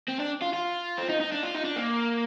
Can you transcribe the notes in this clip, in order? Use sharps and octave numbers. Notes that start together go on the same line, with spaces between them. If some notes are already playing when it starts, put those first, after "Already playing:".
C4
D4
F4
F4
C4
D#4
D#4
D4
F4
D#4
D4
A#3